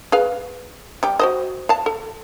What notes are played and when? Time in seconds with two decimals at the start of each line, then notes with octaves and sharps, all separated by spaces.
0.12 G#4 B4 F5
1.03 G3 G4
1.20 F#4 C5 D#5
1.69 F5 A5
1.86 A4